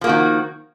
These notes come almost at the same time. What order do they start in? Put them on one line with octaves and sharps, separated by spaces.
F3 A#3 F#4 D#3